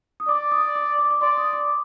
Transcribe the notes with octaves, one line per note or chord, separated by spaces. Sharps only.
D#6
D5 D6
D#6
D6
D6
D6
D5 C6
D#6
D6